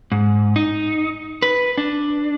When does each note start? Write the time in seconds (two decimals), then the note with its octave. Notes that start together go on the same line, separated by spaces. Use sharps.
0.12 G#2
0.56 D#4
1.42 B4
1.78 D4